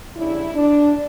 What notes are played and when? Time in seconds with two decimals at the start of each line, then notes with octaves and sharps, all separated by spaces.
0.16 E2 C#3 G3 D4 E4
0.55 D4